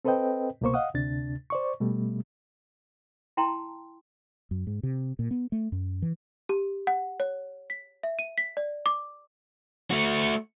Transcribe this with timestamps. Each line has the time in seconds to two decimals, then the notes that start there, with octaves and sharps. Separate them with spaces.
0.05 C4 A4 B4 C5 D#5 G5
0.61 C2 B2 A#3 C5 C#6
0.74 D#5 F5 F#5 D#6
0.94 D2 C3 D4 A6
1.50 C5 D5 C#6
1.81 B2 G3 A3
3.37 E4 G5 A5 A#5 C6
4.51 F#2
4.67 G#2
4.83 C3
5.19 A#2
5.31 B3
5.52 A3
5.72 F#2
6.02 E3
6.49 G4
6.87 F#5
7.20 C#5
7.70 B6
8.03 E5
8.19 D#7
8.38 B6
8.57 D5
8.86 D6
9.91 A3 F#4